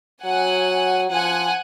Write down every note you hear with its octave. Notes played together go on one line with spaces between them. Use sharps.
F#3 F#5 G#5
F3 F#5 G#5